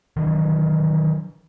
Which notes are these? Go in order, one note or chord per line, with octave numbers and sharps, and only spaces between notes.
D#3 E3 F#3 D4